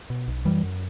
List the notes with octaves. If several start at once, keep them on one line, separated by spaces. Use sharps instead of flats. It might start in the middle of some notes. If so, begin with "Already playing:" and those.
B2
B1
F#2 E3 G3
F#2